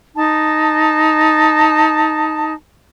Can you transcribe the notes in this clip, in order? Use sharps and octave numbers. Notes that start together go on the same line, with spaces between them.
D#4 A5